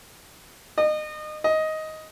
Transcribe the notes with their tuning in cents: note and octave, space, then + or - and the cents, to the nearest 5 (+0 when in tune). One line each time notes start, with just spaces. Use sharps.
D#5 -30
D#5 +10